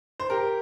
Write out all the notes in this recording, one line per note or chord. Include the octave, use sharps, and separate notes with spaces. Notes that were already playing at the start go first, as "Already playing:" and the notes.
C5
G4 A#4